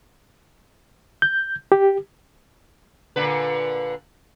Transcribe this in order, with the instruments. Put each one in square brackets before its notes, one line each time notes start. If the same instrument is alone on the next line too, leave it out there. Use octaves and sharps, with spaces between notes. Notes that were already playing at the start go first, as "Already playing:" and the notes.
[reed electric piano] G6
G4
[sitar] A#2 D3 B4